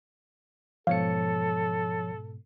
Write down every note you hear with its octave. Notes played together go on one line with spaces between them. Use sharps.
G#2 B2 F3 A4 C#5 F5 C#7